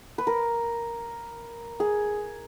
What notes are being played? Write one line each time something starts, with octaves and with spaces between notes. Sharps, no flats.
B4
A#4
G#4